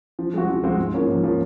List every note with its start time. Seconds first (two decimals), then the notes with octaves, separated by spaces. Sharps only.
0.19 F3
0.34 G#3 C4 F#4
0.48 F3
0.64 G#3 C4 F#4
0.78 G#2
0.94 F3 A#3 C#4
1.08 G#2
1.24 F3 A#3 C#4